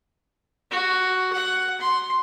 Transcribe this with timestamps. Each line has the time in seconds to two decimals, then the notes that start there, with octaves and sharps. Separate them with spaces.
0.71 F#4
1.32 F#5
1.80 C6